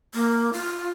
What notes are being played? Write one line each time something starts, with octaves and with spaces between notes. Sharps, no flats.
A#3
F4